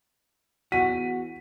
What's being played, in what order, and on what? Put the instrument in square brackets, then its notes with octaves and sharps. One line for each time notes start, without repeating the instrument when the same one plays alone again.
[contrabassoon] E2 [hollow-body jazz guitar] F#4 [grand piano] B6 D#7